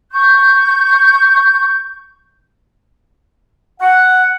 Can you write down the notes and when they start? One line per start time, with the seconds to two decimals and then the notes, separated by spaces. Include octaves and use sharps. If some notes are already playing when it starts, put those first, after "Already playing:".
0.12 C#6 G6
3.80 F#5